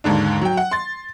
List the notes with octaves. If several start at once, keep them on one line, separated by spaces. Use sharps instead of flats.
D#2 G#2 D3 D4
F#3 G5
F#5
C6 A6